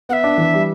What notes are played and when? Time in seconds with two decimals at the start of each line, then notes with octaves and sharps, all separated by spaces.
0.09 B3 E5 F#5
0.24 D4
0.38 E3
0.54 G3